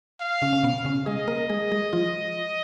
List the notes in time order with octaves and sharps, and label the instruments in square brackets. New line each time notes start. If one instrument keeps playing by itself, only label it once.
[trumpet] F5
[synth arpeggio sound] C#3 C#4
C#4
B2 B3
C#3 C#4
[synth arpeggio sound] G#3 G#4 [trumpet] D#5
[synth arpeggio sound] A#3 A#4
G#3 G#4
G#3 G#4
F3 F4